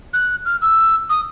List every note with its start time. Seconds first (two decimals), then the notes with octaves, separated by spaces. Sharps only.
0.14 F#6
0.46 F6
0.62 E6
1.10 D#6